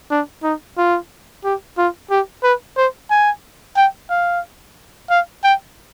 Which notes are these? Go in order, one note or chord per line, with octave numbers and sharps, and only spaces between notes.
D4
D#4
F4
G4
F4
G4
B4
C5
G#5
G5
F5
F5
G5